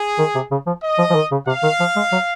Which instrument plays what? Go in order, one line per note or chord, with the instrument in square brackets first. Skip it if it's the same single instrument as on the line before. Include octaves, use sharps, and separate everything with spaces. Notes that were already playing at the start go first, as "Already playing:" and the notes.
Already playing: [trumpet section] G#4
[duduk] D#3
C3
C#3
F3
[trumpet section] D#5
[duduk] F3
F3
D#3
C#3
[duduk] C3 [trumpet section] F5
[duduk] D#3
F3
G#3
F#3